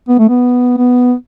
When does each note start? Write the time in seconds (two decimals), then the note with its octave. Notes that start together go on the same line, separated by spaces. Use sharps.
0.08 B3
0.19 A3
0.29 B3
0.77 B3